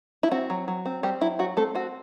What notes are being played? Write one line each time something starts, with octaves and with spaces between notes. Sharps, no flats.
E4
C4 F#4
F#3
F#3
C4
G3 C4 G4
F#3 E4
F#3 F#4
A3 C4 A4
C4 F#4